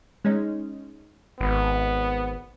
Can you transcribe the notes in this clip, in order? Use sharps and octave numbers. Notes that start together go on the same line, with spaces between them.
G#3 C#4 D#4
G#1 B3